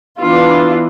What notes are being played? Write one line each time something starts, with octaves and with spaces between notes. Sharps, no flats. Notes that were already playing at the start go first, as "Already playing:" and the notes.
E3 B3 D4 F4